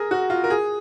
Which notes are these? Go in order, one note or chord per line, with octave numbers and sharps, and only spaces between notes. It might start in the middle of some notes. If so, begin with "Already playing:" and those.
Already playing: G#4 A#4
F#4
F4
A#4
G#4